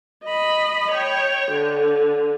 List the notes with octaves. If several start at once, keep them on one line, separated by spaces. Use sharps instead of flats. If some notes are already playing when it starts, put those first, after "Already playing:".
D#5 B5
C#5 G5
D3